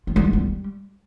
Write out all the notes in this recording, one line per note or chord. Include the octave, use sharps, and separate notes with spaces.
F4
G3
B3
G3